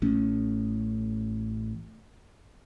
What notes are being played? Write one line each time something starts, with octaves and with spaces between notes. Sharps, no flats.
A1 A3 C#4